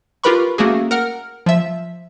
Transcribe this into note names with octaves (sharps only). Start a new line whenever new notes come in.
F4 G4 A#4 B4 B5 C#6
A3 A#3 C#4 F#4 G#4
A#4 F#5 F6
F3 E5